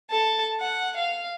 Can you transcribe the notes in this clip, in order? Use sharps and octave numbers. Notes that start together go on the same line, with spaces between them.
A4 A5
F#5
F5